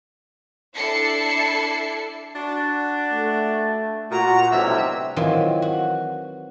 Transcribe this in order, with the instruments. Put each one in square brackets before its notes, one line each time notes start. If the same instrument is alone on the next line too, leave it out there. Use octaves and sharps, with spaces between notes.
[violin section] D4 E4 A4 C7 C#7
[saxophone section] D4 F#4
[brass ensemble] A3
[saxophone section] A#2 [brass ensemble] F#4 [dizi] A#5
[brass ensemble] B1 A2 C3 [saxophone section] E3 G3 D4 [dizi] E5
[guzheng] D#3 E3 F#3 C4 F4
F#4